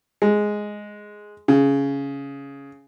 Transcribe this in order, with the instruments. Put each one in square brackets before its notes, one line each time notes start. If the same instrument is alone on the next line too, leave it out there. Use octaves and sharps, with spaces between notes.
[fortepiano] G#3
C#3